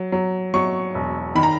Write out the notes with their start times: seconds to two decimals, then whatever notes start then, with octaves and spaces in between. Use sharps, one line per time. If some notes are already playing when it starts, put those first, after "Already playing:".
Already playing: F#3
0.12 F#3
0.54 F#3 C#6
0.95 E1
1.35 D#3 B5
1.43 A#5